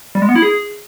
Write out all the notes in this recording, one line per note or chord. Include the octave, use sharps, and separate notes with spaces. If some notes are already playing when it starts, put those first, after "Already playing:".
G3
G#3
B3
E4
G#4